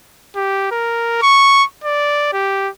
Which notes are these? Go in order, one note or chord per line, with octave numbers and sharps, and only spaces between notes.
G4
A#4
C#6
D5
G4